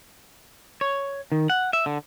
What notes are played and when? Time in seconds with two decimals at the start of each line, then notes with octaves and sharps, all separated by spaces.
0.81 C#5
1.32 D#3
1.50 F#5
1.73 E5
1.86 D3